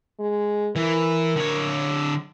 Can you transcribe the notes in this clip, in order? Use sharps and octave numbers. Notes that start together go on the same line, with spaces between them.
G#3
E3 A#4
D3 C#5